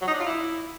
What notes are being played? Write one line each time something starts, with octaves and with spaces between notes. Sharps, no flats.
F#3
D#4
D4
F4
E4